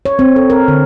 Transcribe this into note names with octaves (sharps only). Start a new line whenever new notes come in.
C#5
C4
A4
A#4
D3